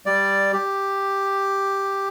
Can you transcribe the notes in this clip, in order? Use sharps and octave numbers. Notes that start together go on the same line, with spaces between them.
G3 D5
G4